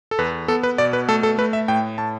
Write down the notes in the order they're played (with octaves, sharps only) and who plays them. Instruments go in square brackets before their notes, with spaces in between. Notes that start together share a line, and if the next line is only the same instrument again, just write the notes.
[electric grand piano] A4
E2 B4
B3 A4
B4
B2 D5
B4
A3 A4
A4
A3 B4
E5
A2 G5
A2 A5